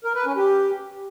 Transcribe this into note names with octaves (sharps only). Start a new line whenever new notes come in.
A#4
B4
C#4
G4